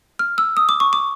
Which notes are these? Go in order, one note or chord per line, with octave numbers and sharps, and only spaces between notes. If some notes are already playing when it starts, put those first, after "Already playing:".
F6
E6
D#6
D6
C#6
D6